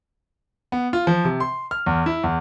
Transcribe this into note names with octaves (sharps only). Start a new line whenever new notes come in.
B3
F4
F3
C3
C6
F6
E2
E4
E2